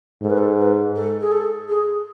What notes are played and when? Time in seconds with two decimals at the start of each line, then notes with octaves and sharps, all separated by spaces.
0.22 G#2 A4
0.29 B4
0.37 A4
0.58 B4
0.95 A4
1.21 G#4
1.31 A4
1.68 G#4